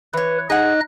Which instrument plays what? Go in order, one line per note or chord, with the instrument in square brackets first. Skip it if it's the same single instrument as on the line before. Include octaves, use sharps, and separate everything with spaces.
[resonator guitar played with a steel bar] E3 C#5 [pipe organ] B4
[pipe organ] D#4 D#5 F#6 [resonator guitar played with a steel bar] G#4 F#5